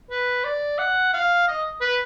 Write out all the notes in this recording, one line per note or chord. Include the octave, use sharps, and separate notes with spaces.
B4
D5
F#5
F5
D#5
B4